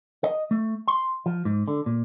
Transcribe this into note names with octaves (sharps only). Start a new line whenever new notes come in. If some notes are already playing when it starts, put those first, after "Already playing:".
D#5
A3
C6
F3
G#2
D3
A#2